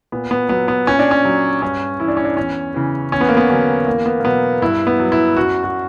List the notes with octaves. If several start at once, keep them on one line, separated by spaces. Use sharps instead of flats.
A#2 B3
B3
F#3 B3
B3
A#2 C#4
D4
C#4
F#3
G2 C#4
E3 E4
D4
C#4
D4
E2 C#4
C#3 E3
E2 C#4
B3
A#3
B3
D3 F#3 C#4
E2 A#3
B3
A#3
B2 F#3 B3
G2 E4
B3
F#3
E4
F#2 F#4
F#4